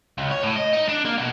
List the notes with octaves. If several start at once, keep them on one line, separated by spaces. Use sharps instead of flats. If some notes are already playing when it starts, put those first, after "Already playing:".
C#2
C#5
A2
D#5
D#4
D4
A#3
B2